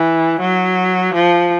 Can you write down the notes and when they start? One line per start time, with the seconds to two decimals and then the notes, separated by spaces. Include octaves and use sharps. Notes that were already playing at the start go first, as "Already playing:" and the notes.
Already playing: E3
0.40 F#3
1.15 F3